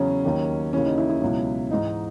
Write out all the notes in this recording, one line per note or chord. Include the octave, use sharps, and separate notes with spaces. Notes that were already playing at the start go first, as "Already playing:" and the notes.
Already playing: E2 C#3 F#3 C#4
D#2 D#3 F#3
D#2 C#3 E3 C#4
D#4
E4
E4
C#2 B2 F#3
G#2 E3 D#4